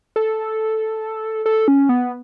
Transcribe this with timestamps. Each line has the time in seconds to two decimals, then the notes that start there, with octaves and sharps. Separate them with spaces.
0.16 A4
1.46 A4
1.68 C#4
1.89 B3